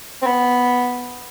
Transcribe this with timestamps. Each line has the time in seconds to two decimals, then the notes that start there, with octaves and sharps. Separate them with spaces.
0.22 C4
0.26 B3